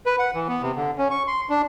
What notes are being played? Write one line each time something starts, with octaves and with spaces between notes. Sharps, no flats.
B4
F#5
E3
B3
C3
D3
C#4
C#6
C6
D4